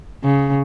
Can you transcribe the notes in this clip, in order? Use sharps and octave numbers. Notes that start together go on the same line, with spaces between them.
C#3